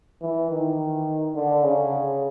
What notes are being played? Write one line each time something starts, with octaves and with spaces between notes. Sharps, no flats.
E3
D#3
D3
C#3